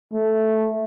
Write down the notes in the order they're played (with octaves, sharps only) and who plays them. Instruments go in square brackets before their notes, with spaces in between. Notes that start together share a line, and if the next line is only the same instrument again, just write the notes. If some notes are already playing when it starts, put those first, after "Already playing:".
[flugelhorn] A3